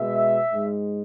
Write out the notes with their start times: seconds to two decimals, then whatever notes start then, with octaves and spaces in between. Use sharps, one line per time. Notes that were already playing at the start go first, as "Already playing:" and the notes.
Already playing: B2 G#3 E5
0.52 G#2 G#3